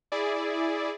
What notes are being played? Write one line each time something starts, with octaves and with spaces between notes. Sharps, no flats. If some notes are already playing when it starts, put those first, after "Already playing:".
E4 G#4 D5